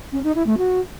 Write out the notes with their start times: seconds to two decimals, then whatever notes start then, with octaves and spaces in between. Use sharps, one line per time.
0.12 C#4
0.24 D#4
0.35 E4
0.46 A3
0.58 F#4